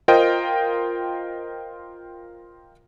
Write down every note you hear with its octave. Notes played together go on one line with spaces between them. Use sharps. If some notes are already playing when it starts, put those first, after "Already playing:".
F4 A#4 C5 D#5 G5